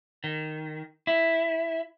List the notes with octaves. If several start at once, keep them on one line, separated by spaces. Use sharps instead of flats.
D#3
E4